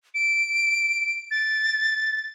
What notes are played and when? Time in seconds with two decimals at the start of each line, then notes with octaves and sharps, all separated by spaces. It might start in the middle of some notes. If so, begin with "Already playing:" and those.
0.14 D7
1.31 A6